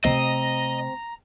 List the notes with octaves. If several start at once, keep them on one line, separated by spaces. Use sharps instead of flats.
C3 A3 C4 D#5 A#5